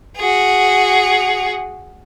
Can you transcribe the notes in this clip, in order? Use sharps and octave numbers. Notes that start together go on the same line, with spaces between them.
F#4 G#4